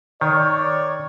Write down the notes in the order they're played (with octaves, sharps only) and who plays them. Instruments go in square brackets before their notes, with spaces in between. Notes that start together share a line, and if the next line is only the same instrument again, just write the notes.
[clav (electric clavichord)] D#3 [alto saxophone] C#5 [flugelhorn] D5